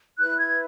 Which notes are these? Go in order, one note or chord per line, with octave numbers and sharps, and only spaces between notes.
E4 B4 F#6
G#6